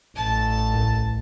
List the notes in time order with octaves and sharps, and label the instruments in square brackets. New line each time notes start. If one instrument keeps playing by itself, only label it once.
[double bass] A1 [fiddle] A5
[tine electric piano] C2 A2